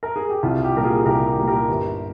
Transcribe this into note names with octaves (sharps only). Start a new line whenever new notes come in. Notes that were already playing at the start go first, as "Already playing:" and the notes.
A#4
G#4
G4
C2 F4
F4
G4
A#2 G3 A#3 A#4
F4 G#4
C2 G4 A#4
G4
A#2 G3 A#3
G4 A#4
G1